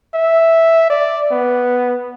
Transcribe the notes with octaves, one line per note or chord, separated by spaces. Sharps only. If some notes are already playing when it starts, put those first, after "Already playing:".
E5
D5
B3